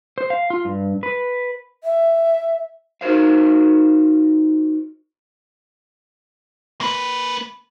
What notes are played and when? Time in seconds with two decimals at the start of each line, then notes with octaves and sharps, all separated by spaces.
0.18 C5
0.30 F5
0.50 F4
0.65 G2
1.03 B4
1.84 E5
3.01 D#4 F#4 A#4 C5 F5
6.81 A#3 B4